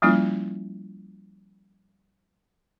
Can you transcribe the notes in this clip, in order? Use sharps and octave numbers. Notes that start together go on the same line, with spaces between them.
F3 G3 A#3 C#4 E4 F4